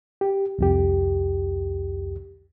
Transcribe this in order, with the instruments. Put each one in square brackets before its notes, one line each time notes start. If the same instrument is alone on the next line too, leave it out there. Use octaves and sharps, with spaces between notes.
[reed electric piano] G4
C2 F2 G4